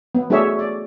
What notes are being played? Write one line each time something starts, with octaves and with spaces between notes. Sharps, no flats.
B3
A3 D4 F#4 G#4 C#5 E5
D5